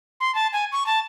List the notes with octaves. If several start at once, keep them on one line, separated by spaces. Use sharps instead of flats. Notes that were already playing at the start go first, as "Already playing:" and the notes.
C6
A5
G#5
C#6
A5